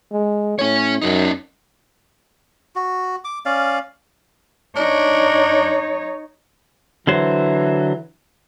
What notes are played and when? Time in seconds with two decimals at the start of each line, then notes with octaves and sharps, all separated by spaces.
0.12 G#3
0.59 A2 C#4 C#5
1.02 F#2 C#4 D#4
2.76 F#4
3.24 D6
3.46 C#4 D5 F5
4.76 D4 D#4 C#5
7.07 D3 E3 F#3 C5